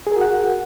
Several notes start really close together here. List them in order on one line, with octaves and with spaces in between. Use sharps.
G#4 A#4 F#4 F#5